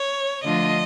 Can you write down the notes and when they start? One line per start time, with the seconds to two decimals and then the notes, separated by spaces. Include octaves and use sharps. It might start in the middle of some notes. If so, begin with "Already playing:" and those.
Already playing: C#5
0.43 D3 F3 A3 D4 F4 D#5